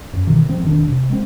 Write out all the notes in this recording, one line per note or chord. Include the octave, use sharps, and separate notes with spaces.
F#2
B2 D#3 E3
G#2 F3 C4
E1 D#3 D4
C3
G#3 C4